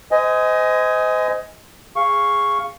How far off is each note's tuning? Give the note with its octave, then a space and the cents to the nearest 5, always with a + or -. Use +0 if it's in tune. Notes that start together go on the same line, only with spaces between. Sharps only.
C5 -35 D#5 +20 G#5 +0
G#4 -10 F5 +0 C#6 +0